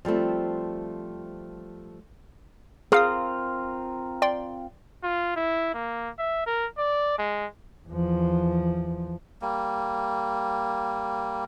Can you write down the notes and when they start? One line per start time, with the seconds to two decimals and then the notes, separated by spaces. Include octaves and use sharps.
0.05 F3 G3 A3 C4
2.92 C4 F4 G#4 A#4 F5 D#6
4.22 D5 G5 C6
5.03 F4
5.36 E4
5.74 A#3
6.18 E5
6.47 A#4
6.78 D5
7.18 G#3
7.88 E2 F3
9.42 G3 A#3